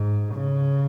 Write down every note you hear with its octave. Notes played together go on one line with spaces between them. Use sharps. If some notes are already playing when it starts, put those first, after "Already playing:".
Already playing: G#2
C#3